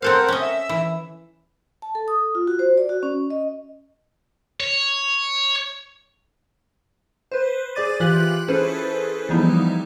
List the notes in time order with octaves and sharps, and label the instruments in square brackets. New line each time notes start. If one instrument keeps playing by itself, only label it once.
[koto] C4 A4 F5 [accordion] A#4 C5 F#5
[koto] C#4 D#5
[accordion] E5 E6
[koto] E3
[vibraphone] A5
A4
D#6
F4
F#4
C5
D5
F#4
C#4
D#5
[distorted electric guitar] C#5
[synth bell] B4 C5
G#4 C5 D5 D6 A6 D#7
E3 F4 G4 F#6 F#7
C#4 E4 G#4 A4 B4 C5
E3 F3 G3 B3 D#4 E4